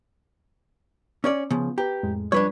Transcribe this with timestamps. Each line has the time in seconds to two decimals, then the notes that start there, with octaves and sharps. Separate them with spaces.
1.24 C#4 C#5 D5
1.50 C#3 F3 B3
1.78 G4 B4 A#5
2.03 F2 A2 G#3
2.32 F3 G3 D4 F4 B4 C#5